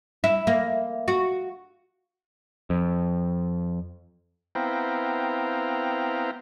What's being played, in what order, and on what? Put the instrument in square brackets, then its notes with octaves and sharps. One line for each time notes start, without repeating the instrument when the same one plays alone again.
[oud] E4
A#3
F#4
[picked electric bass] F2
[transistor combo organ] B3 C4 E4 F5 G5 A#5